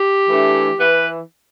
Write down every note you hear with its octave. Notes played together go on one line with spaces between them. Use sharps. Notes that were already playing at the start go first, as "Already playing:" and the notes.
Already playing: G4
E3 A3 D4
E3 B4